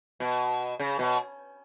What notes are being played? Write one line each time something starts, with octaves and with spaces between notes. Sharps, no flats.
B2
C#3
B2